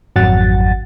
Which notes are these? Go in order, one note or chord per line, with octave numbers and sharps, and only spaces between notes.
G#1 F2 F#3 F#5 A6